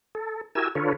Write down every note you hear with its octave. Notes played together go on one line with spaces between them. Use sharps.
A4
E4 F#4 G4 A#4 G#5 E6
D3 F4 A4 B4 C#5